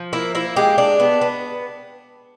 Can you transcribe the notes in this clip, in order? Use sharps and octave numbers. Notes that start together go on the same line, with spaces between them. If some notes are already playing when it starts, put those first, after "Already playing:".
Already playing: F3
A#3 E4
A#3 E4
G#3 G4
D4
B3
B3